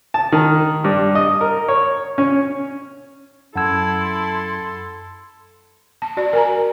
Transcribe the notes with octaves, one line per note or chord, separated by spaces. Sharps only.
A5
D#3
G2
D#5
A#4
C#5
C#4
F#2 E4 A4 F#5 A5 C6 E6 G#6
A5
F#4 D5
A#4 G#5 A#5